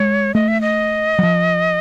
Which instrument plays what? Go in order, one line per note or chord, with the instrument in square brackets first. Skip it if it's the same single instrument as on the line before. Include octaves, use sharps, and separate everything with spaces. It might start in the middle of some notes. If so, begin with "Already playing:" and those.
Already playing: [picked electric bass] G#3 [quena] C#5
[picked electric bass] A3 [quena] D#5
[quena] E5
D#5
[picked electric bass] F#3
F3